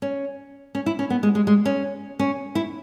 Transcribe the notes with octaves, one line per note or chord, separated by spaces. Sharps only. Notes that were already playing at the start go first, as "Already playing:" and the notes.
C#4
C#4
E4
C#4
B3
G#3
G#3
G#3
C#4
C#4
E4